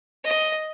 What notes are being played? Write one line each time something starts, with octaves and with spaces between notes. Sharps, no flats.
D#5